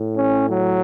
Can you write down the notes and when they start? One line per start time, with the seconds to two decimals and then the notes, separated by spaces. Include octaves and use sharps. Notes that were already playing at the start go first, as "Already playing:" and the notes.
Already playing: A2
0.17 C#4
0.49 F#3